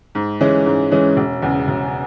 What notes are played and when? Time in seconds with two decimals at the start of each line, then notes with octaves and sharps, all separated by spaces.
0.15 G#2
0.41 E3 G#3 C#4
0.66 G#2
0.91 E3 G#3 C#4
1.17 E1
1.42 E2 C#3
1.68 E1